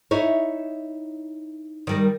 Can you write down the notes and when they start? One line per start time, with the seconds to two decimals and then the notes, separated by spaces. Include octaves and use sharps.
0.11 D#4 E4 C#5
1.87 D#3 G3 A#4